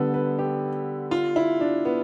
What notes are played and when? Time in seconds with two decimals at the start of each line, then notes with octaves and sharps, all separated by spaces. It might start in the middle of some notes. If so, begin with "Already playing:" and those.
Already playing: D3 G3 B3 A4 B4
0.14 B4
0.39 G4
1.11 F4
1.36 E4
1.60 D4
1.85 B3